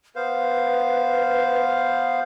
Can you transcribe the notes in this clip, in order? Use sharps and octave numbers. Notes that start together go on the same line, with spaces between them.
B3 B4 C5 F5